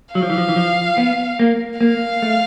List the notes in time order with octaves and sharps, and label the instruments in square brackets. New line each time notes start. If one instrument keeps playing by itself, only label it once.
[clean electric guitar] F#3 [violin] F5
[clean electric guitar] F3
E3
F3
E3
F3
B3
A#3
[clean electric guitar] A#3 [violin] F5
[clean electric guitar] A3